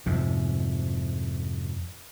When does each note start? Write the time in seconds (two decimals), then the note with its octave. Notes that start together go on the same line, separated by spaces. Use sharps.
0.06 F2 G#2 C3